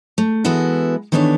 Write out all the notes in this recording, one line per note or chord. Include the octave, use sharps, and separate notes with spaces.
A3
E3 G#3 B3 E4 F#4 A4
D#3 E3 B3 D4 A4 C#5